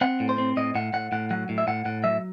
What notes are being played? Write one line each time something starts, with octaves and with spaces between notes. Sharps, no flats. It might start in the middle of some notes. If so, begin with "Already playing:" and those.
C4 F#5
A2
C5
C4
A2 D#5
A2 F#5
A2 F#5
A2 F#5
F#3 F#5
A2
E5
A2 F#5
A2 F#5
F#3 E5